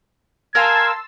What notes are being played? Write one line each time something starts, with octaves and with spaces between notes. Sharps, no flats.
A#4 F5 G#5 A5 C6 E6 G#6